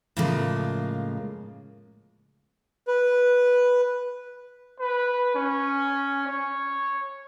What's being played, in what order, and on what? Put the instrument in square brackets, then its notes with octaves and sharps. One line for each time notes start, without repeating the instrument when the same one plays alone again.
[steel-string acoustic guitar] A2 C#3 F3 G#3 A#3
[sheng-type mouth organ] B4
[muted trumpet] B4
C#4
C#5